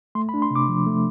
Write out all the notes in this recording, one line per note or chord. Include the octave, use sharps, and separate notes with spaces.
A3 C6
B5
D4
C6
C3 D6
F3
A3